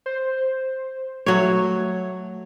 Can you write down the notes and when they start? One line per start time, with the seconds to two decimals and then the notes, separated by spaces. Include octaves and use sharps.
0.06 C5
1.26 F#3 A3 C#5